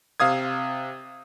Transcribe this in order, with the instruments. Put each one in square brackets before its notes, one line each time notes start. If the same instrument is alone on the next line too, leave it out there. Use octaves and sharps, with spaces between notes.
[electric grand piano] C3 F5 D#6 G#6